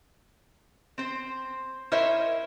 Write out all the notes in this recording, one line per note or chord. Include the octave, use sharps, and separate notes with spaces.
C4 C5
E4 A#4 C5 C#5 D#5 E5